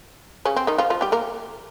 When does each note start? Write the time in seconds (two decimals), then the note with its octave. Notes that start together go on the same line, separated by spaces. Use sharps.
0.45 C#3 C#4
0.56 C4
0.67 D#3 D#4
0.78 F3 F4
0.90 F3 F4
1.01 G3 G4
1.12 A#3 A#4